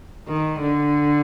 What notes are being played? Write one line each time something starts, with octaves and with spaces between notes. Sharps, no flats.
D#3
D3